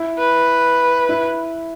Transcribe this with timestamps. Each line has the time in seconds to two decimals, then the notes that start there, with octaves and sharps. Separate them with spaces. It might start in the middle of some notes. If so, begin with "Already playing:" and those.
Already playing: E4
0.19 B4
1.09 E4